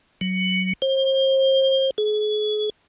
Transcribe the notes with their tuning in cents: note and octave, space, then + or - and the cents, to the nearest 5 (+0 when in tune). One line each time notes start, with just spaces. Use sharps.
F#3 +15
C5 +35
G#4 +35